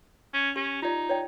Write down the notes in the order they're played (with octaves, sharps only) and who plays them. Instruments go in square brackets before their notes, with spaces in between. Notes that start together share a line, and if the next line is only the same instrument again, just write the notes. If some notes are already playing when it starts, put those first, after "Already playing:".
[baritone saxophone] C#4
[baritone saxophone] C#4 [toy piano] G4
[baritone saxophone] D#4 [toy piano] F4 D5
[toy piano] C#5 D5 G5